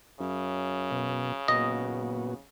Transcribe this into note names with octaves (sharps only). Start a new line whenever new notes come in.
F#2 C#3
B2
F#1 A#2 B3 F#4 D#5